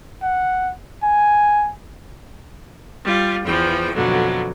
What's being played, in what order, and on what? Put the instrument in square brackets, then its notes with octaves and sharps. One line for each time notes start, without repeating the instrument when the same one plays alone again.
[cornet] F#5
G#5
[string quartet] G3 F4
E2 E3 F3 G5
F2 B2 D3 F#3